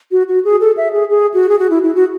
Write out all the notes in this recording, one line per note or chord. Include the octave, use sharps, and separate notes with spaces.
F#4
F#4
G#4
A4
E5
G#4
G#4
F#4
G#4
F#4
E4
E4
F#4